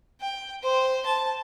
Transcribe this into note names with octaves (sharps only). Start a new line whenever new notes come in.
G5
C5
A5